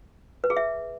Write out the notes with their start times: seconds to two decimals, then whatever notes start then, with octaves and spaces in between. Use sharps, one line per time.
0.44 B4
0.50 G#4
0.57 E5